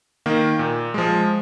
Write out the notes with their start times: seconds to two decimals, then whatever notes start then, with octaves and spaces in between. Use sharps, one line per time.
0.26 D#3 A#3
0.59 A#2
0.94 F3 G#3